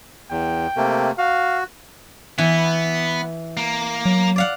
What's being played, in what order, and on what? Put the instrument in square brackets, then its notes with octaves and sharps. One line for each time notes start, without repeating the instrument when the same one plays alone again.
[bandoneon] E2 [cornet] G5
[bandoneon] C3 A3 A#3
[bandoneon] F#4 [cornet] F5
[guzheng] E3 [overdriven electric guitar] B3
[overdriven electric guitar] A#3
[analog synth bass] F#3
[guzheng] D5 F5 F#5